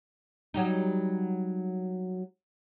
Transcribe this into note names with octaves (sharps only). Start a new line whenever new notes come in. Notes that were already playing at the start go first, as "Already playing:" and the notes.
F#3 G3 D#4